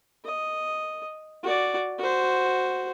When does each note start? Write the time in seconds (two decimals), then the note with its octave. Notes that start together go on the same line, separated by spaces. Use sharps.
0.25 D#5
1.43 F#4 D5
1.99 F#4 C5